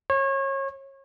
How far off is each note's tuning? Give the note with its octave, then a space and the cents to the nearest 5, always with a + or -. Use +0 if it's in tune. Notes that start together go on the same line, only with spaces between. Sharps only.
C#5 -30